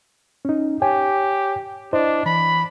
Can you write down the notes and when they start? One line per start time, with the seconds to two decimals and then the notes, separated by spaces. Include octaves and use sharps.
0.45 C#4 D#4
0.82 G4 C#5 G5 G#5
1.93 D4 E4 C5 D#5
2.26 E3 B5